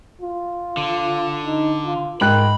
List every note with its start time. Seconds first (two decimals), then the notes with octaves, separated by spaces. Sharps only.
0.22 F4
0.77 D3
1.46 D#4
1.86 F4
2.21 G#2 A#4 G5 B5 F#6